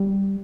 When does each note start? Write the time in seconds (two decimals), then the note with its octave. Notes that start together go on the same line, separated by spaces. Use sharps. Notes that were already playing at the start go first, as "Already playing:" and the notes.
Already playing: G3